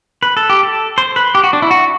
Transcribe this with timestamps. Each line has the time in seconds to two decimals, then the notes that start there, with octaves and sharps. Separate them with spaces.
0.23 B4
0.37 A4
0.50 G4
0.63 A4
0.98 C5
1.16 B4
1.35 G4
1.44 F#4
1.53 D4
1.62 E4
1.71 F#4